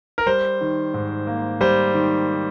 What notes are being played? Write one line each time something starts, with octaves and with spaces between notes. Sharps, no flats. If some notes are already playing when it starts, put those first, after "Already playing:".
A#4
G3 C5
D#3
G#2
A#3
G3 C5
D#3